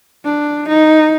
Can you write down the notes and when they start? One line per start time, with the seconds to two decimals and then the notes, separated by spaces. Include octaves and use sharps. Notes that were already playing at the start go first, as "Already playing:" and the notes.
0.24 D4
0.68 D#4